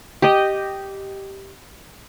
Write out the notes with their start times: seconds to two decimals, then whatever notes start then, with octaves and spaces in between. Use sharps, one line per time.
0.22 G4 D#5